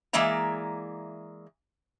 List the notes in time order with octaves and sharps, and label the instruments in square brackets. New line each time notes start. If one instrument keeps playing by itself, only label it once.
[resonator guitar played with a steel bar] E3 G#3 A#3 D5 E5 A#5